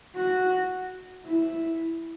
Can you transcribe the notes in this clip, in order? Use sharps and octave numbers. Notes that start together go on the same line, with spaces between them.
F#4
E4